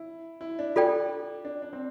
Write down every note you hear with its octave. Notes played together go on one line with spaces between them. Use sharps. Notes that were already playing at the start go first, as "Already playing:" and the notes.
Already playing: E4
E4
D4
D4 F4 A4 D5 G5
D4
D4
C4